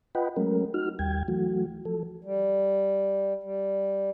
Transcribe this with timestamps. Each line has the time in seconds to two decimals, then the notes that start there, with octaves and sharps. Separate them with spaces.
0.15 F4 B4 D#5 F#5 G5 B5
0.36 F#3 G#3 A3 C#4 A#4
0.74 D#4 F#4 F6
0.99 D#2 G3 G5 G#6
1.28 E3 F#3 A3 F#4
1.85 F3 A4
2.24 G3
3.43 G3